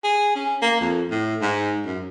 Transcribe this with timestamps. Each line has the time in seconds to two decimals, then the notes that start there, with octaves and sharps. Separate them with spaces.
0.04 G#4
0.35 C#4
0.62 A#3
0.80 F2
1.11 A2
1.42 G#2
1.86 F#2